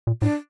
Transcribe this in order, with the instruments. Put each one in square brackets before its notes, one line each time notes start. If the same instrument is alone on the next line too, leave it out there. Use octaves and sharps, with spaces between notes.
[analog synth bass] A#2
[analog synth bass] A2 [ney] D4